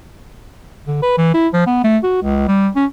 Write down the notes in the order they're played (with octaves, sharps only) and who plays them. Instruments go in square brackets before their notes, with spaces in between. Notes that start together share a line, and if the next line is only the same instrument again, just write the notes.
[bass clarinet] D3
B4
E3
E4
F3
B3
A3
F#4
C#2
G3
C#4